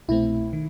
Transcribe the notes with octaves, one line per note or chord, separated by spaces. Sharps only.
C2 B2 A3 C4 E4
D#3